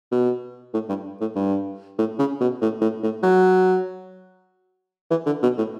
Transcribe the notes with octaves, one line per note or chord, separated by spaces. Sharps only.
B2
A2
G2
A2
G2
A2
C#3
B2
A2
A2
A2
F#3
E3
D3
B2
A2